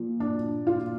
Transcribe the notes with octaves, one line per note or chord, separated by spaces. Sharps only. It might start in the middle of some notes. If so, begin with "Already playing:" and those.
Already playing: A#2 F3
D4
F4